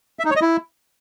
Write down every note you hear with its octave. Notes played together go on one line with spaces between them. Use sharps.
E5
D#4
C#5
D#5
E4